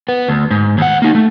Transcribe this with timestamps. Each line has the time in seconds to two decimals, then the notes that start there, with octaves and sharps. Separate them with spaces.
0.09 B3
0.29 D2
0.51 G#2
0.78 D#2 F#5
1.02 A#3 D#4
1.15 A3